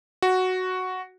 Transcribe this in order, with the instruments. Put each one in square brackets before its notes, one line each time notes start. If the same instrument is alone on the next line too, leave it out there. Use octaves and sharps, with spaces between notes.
[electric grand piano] F#4